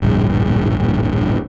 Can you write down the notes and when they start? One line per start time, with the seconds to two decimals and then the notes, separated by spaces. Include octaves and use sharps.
0.02 D1 A#1 G2